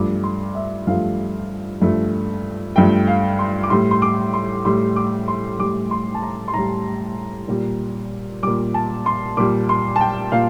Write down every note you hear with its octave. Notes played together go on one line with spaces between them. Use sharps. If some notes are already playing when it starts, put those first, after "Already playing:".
Already playing: G2 F3 A3 D6
C6
E5
G2 F3 A3 F5
G2 F3 A3
G2 F3 A3 G5
F5
C6
D6
A2 G3 C6
C6
D6
C6
A2 G3 C6
D6
C6
A2 G3 D6
C6
A5
A#5
C6
A2 G3 A#5
A#2 G3
A#2 G3 D6
A5
C6
A#2 G3 D6
C6
A5
G5
A#2 F5